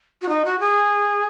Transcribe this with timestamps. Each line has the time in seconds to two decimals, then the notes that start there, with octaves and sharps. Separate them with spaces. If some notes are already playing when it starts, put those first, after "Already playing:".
0.22 F#4
0.29 D#4
0.45 F#4
0.60 G#4